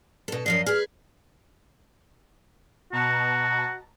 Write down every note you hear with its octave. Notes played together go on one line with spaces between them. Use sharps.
B2 A4
F#2 F3 D#5 C7
G#4 B4 F6
B2 F#4 A5 A#5